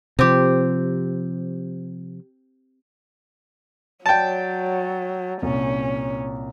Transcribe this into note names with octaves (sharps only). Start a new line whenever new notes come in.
C3 F3 C4 G4
F#3 C#5 D5 G5 A5
C2 A#2 C#4